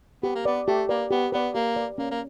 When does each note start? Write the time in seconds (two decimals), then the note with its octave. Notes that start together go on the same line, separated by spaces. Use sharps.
0.23 B3 G4
0.35 A#3
0.45 B3 B4 D5
0.68 A3 G4
0.89 A#3 B4 D5
1.11 B3 G4
1.32 B3 B4 D5
1.55 A#3 G4
1.76 B4 D5
1.98 A#3 C#4
2.11 A#3